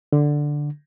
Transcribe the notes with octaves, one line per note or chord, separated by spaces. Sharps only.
D3